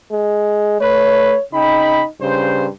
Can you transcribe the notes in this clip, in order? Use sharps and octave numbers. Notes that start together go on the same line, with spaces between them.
G#3
A3 B4 C#5
C#3 D#4 G5 B5
G2 C#3 C5